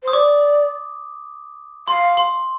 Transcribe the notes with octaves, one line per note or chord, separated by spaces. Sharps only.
C5
D#6
D5 D6
F5 C6
C6